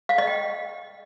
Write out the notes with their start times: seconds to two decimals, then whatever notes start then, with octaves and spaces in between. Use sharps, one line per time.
0.09 F5
0.18 D#5
0.27 G5